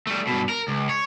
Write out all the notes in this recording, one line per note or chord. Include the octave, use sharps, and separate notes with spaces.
G3 A3
G2 B2
A#4
C#2
C#5